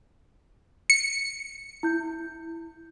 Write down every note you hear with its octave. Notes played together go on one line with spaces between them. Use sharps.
C#7
E4 G6